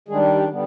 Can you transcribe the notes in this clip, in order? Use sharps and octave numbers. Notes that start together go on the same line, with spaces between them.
D#3 G3 G#3 D4 G#4
G4
D3 G3 B3